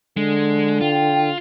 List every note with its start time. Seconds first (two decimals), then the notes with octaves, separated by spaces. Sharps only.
0.17 D3 G#3
0.81 F4 G5